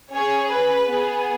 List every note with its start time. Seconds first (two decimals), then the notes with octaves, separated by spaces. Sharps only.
0.14 C#4 G#4 C#5
0.50 B4
0.87 B3 G#4